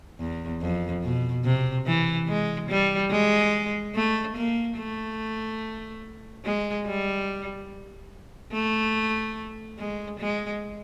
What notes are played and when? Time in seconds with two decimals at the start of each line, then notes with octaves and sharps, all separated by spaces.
0.19 E2
0.62 F2
1.03 B2
1.44 C3
1.86 E3
2.28 G#3
2.69 G3
3.11 G#3
3.95 A3
4.36 A#3
4.77 A3
6.44 G#3
6.86 G3
8.53 A3
9.79 G#3
10.20 G#3